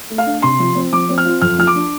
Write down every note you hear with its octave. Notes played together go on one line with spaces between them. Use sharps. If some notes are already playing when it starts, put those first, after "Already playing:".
A3
F5
D4
C3 C6
F3
C4
F3 D6
C4
F6
F4
F2 F6
F3 F6
D6
D4